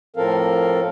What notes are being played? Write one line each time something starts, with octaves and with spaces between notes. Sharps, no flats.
A2 F3 C4 A4 A#4 F5